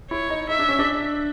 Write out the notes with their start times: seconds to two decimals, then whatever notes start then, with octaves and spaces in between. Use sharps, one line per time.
0.11 E4 C#5
0.30 D#4
0.49 D#4 E5
0.59 D4
0.69 C#4
0.79 D4